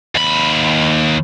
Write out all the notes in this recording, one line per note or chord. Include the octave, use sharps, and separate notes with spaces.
D#2 B5